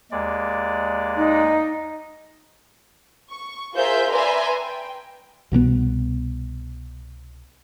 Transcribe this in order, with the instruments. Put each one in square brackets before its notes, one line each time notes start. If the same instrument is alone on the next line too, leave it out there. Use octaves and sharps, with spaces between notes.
[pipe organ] D#2 G#3 D5
[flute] D#4
[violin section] C#6
F4 G#4 A#4 C5 E5 G6
B4 D5 E5 G#5 A#5 C6
G5
[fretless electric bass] C2 B2 G3 B3